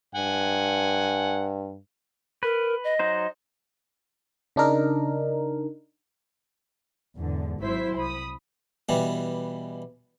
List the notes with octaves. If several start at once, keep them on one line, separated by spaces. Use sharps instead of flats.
G2 F#5 G#5
A#4 B4
D#5
F#3 D#4 C5
C#3 D4 D#4 A#4
E2 G#2 D3
G#1 F#3 E4 C5 E5 B6
C2 B5 D#6
B2 E3 G3